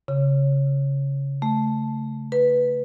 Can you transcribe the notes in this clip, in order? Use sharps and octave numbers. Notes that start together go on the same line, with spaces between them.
C#3
A3
B4